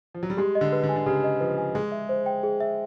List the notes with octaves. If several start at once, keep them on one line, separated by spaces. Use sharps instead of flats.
F3
F#3
G3
G#3 G4
D#5
D3
B4
D3
G#5
D3
C#3 G4
D#5
F3 B4
G#5
G#3 G#4
E5
C5
G5
G#4
E5